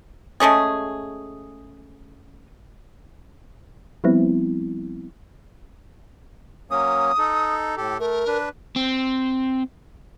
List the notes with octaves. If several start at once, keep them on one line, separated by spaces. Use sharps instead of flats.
G#3 A3 C#4 G#4
F3 G3 B3 C4 E4
F#3 A#3 C#4 D#6
D#4 A4
A2 G4 A4
A3 A#4
D4 B4
C4